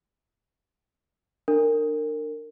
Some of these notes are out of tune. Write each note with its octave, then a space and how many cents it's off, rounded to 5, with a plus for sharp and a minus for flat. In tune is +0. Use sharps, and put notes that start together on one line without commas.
D4 +30 A#4 -25